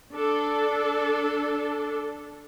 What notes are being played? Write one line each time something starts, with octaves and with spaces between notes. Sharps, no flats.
D4 A4